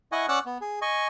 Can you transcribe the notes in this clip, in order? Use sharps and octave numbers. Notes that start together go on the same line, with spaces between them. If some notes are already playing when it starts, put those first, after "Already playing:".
E4 D#5 F#5 G#5 C#6
C#4 D5 F#5 E6 F#6
B3
G#4
D#5 G#5 C#6